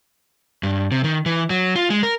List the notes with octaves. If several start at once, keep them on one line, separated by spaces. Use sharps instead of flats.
G2
C3
D#3
E3
F#3
F4
G#3
A#4